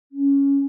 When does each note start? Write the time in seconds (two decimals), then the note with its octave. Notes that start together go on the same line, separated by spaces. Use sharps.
0.12 C#4